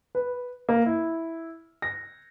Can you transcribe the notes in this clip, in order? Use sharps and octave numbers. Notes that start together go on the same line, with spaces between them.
B4
A#3
E4
A#6